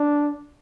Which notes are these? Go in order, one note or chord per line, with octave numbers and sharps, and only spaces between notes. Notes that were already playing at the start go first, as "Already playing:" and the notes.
Already playing: D4